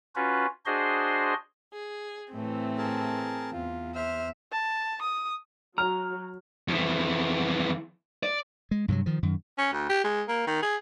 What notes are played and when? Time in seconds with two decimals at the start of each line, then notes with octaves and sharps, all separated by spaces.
0.16 C#4 F4 F#4 B4
0.66 D4 F#4 G#4 C5 D#5 C6
1.73 G#4
2.32 A2 E3 A3 C4
2.78 G#4 A#4 A5
3.52 E2 F4
3.95 C5 E5 F6
4.52 A5
5.02 D#6
5.78 F#3 A#5 F6
6.68 F2 E3
8.23 D5
8.71 G#3
8.88 G2 C3 F3 F#3
9.06 D#3 F3
9.23 F#2 D#3
9.58 C#4
9.72 D2
9.89 G4
10.04 G#3
10.28 A#3
10.47 D#3
10.62 G#4